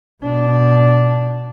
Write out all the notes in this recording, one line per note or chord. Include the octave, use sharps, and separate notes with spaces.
B2 D4